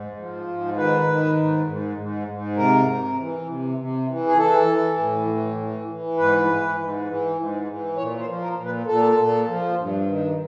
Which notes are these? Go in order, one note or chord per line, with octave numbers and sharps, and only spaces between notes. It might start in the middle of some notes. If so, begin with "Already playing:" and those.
Already playing: G#2
F3
G#2
D#3 B4
D#3
G#2
G#2
G#2
G#2
C3 A#4
C3
E3
C3
C3
E3
G#4
E3 A4
E3
A2
E3
E3
E3
G#2 B4
E3
G#2
E3
G#2
E3
A#2 C#5
C5
F3
A#4
A#2
B4
A#2 A4
A#2
F3
G2
D#3